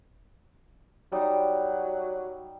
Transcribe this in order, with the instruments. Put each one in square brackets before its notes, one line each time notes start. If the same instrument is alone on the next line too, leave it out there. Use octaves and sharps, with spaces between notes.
[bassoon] F#3 [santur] G3 D#4